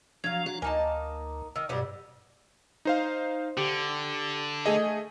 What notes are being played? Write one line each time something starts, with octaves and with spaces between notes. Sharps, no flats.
F3 F#3 D4 F5 G#6
F#3 D4 F#4
D2 A#3 D#4 G#5 A5
D#3 E6
G2 B2 F#3 G3 D4
D#4 C5 F5
D3 G4
A3 G#4 D#5